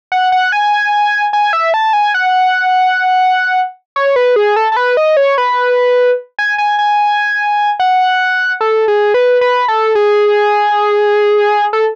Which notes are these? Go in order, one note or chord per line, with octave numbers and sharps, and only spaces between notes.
F#5
F#5
G#5
G#5
E5
A5
G#5
F#5
C#5
B4
G#4
A4
A4
B4
D#5
C#5
B4
G#5
G#5
G#5
F#5
A4
G#4
B4
B4
A4
G#4
A4